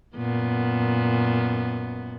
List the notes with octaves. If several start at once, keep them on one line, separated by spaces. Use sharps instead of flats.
F#2 A#2 B3